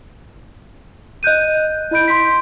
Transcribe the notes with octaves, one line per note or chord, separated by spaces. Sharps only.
D#5 F#6 G6 D#7
E4 D#5 B5 G6 D7
C6 B6